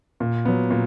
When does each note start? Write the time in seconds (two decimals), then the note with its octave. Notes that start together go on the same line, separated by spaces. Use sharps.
0.20 A#2
0.45 F#3 B3
0.71 A#2